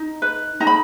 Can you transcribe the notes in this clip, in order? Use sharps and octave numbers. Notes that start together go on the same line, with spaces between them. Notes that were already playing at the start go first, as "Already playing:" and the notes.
Already playing: D#4
B4
D#4 A#5
B5